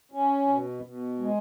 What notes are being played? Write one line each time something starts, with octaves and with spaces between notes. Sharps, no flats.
C#4
B2
B2
G#3